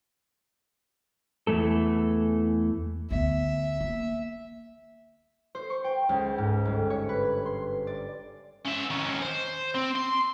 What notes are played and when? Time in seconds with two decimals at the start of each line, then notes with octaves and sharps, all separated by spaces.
1.47 E2 E3 A3 A4
3.11 D2 B3 E5
3.80 A#3
5.55 C5
5.70 C#6
5.84 G5
6.09 C#2
6.38 G#2
6.65 G1
6.90 C#5
7.09 B4
7.46 C6
7.87 D5
8.66 C#4 E5
8.90 D#3 C#4
9.21 C5
9.74 C4
9.95 C6